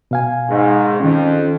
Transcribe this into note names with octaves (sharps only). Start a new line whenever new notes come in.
B2 F5 G#5
G#2 D#3
F2 D#3 C#4